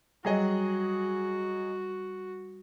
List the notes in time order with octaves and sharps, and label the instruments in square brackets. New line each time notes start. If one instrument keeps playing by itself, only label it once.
[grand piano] F#3 G#4 D#5 [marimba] G3 [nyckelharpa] F#4